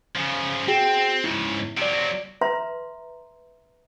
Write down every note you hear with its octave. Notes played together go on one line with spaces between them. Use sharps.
C#3 F3
C4 F#4 G#4 G5
G#2 C#3 E4
C3 F#3 D5 D7
B4 E5 A#5 C6